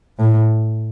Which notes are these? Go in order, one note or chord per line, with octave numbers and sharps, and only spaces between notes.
A2